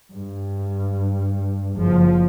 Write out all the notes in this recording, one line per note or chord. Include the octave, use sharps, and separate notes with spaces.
G2
F#1 F3